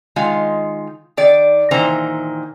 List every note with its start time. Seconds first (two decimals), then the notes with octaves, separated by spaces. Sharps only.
0.16 D#3 G#3 F4 F5
1.17 D#3 D5
1.71 A#2 D#3 E3 C5 A#5